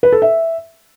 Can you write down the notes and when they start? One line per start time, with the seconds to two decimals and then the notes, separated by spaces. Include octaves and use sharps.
0.03 B4
0.12 A4
0.22 E5